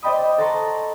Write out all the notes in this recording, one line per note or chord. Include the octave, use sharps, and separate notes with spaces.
C5 D5 D#5 G5 B5 D#6
A4 F#5 A5 A#5 C6 C#6